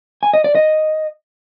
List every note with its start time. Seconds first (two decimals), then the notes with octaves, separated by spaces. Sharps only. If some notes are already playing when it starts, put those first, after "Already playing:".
0.23 G#5
0.34 D#5
0.44 D5
0.55 D#5